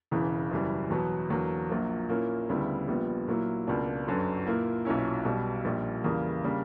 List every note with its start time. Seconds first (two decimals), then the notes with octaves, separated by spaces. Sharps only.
0.11 E1 E2 C#3 E3
0.51 F#1 F#2 E3 G3
0.90 E2 B2 F#3 B3
1.30 E2 D3 F#3 A#3
1.70 A#1 A#2 F#3 A#3
2.09 A#2 A#3 C#4 E4
2.49 D2 C#3 G3 B3 E4
2.88 A#1 A#2 G3 B3
3.27 A#2 F#3 A#3 E4
3.67 C#2 B2 A#3 D4
4.07 G1 F#2 D3 F#3
4.46 A#2 A#3 E4
4.85 B1 A#2 F#3 C#4 E4
5.25 B1 B2 G3
5.65 A#1 A#2 G3
6.04 E2 C#3 E3 G3 A#3
6.44 C#3 G3 A#3 D4